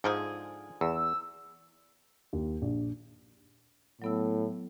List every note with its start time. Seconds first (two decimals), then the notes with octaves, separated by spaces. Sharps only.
0.04 G#2 D3 F3 G#4
0.81 E2 E6
2.33 D#2
2.62 A#1
4.02 A2 F#3 B3 E6